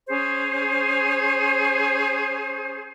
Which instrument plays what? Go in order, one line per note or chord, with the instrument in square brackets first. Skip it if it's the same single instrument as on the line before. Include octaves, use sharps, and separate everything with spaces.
[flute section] C#4 G#4 C5